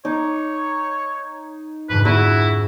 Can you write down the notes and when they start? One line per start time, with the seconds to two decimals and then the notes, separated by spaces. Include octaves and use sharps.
0.05 D#4 C#5 D6
1.89 F2 G#2 D3 B4
2.05 E4 F#4 G#4 B5 D6